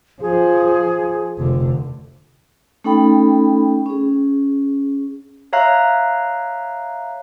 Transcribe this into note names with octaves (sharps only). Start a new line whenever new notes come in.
F3 G#4
F1 D3
A3 C#4 D#4 A4 G5 B5
C#4 G#4
C#5 E5 F5 A#5 F#6